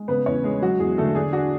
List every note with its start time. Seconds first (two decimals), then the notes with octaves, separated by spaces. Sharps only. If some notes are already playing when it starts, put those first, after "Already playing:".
Already playing: G#3
0.08 C#3 B3 B4
0.26 E2 C#4 C#5
0.44 G#3 G#4
0.62 F#3 F#4
0.79 E2 G#4
0.98 D3 A3 A4
1.15 D4 G#4
1.33 D4 F#4